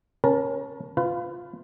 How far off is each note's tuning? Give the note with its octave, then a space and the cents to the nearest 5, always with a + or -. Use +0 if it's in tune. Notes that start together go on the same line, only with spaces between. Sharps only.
C#4 -10 A#4 +30 A5 +0
F4 +0 B4 +30